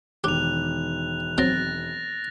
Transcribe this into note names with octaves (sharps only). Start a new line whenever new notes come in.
E1 D#3 G4 F#6 F7
F#3 C4 F#6 A6 A#6